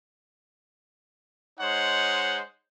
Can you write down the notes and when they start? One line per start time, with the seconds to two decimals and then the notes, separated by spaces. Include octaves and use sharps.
1.59 G#3 D#4 C5 C#5 F#5